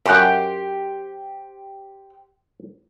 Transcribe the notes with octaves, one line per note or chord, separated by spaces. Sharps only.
F#2 G4 C5 F#5 G5